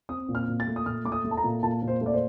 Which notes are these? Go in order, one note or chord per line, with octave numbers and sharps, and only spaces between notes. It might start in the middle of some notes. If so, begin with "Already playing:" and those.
C4 D#6
A#2
F6
A#2
A6
A3
D#6
A#2 F6
A3 D6
D#6
A3
A5
A#5
A#2
A#2 A5
A#2
C5
A3 D5
C5